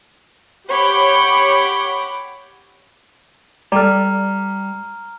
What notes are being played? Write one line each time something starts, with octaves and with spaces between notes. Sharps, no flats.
G4 C#5 F#5 B5 D6 G6
G3 A4 D5 A#5 F6